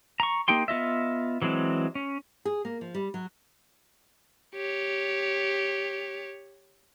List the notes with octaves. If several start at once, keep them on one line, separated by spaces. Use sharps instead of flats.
A#5 C#6
A#3 D#4 G4 G5 C6
B3 F4 D#5 E5
E3 F#3 G#3 C4
C#4
G#4
A#3
F3
G3
F#3
G4 C#5